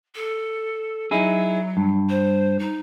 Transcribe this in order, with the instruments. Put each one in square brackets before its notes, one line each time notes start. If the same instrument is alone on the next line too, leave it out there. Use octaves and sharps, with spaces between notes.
[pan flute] A4
[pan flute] F#3 [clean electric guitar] D#4 E4 G#4
[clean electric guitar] G2
[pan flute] C5
D#4